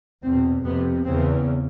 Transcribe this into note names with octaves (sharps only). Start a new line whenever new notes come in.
E2 B2 C4
F2 C3 B3
E2 C#3 C4